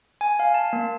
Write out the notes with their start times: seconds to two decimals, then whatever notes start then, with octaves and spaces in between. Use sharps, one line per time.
0.21 G#5
0.39 F5
0.54 A5
0.73 A#3